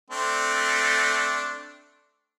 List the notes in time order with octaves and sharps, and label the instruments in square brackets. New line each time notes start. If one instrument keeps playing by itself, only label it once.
[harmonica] A3 C4 D4